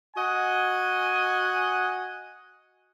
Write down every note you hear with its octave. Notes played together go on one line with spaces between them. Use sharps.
F#4 D#5 F#5 G#5